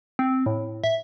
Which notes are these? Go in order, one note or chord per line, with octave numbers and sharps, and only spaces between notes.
C4
A2
E5